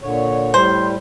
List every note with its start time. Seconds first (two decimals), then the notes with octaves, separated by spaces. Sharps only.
0.02 A#2 D3 C#5
0.54 A2 G3 C5